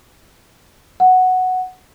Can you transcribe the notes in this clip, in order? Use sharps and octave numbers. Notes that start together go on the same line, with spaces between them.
F#5